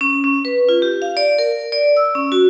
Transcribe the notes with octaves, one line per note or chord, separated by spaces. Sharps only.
C#4
C#4
B4
F4
G4
F5
D5
A#4
D5
E6
C#4
F#4